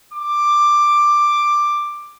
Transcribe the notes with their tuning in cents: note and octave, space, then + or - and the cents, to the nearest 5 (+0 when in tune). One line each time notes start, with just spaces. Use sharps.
D6 +10